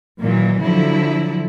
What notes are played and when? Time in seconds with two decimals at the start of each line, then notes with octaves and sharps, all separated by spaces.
0.20 A#2 D#3 E3 F#3
0.62 D3 F3 F#3 E4